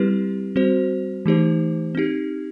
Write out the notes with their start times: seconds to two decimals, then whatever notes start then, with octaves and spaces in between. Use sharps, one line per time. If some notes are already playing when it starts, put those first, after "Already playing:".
Already playing: G3 C4 E4 G4 B4
0.56 G3 C4 F#4 C5
1.26 E3 A3 D#4 G4 C5
1.95 C4 D#4 G4